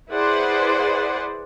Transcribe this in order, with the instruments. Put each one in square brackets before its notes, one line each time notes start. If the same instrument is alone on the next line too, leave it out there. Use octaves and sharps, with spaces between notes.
[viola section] E4 G#4 B4 C5 D5 F#5